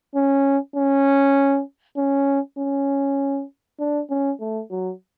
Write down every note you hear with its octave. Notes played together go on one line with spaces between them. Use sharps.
C#4
C#4
C#4
C#4
D4
C#4
A3
F#3